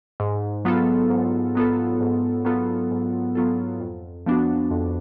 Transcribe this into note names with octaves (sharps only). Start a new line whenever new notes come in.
G#2
F#3 B3 F4 A4
G#2
F#3 B3 F4 A4
G#2
F#3 B3 F4 A4
G#2
F#3 B3 F4 A4
F2
F3 B3 D4 F#4
F2